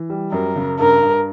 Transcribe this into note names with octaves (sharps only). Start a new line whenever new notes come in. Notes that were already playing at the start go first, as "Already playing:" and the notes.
Already playing: E3
G3
F#2 A#4
C#3
G2 A#4
G2